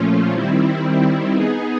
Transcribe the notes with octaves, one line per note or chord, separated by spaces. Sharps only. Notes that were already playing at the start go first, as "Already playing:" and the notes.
Already playing: A#2 F3 A3 C#4 F4
D#3 G3 C4 E4
B3 D#4 G#4